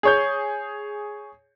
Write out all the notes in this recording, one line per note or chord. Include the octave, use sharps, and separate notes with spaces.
G#4 C#5 G6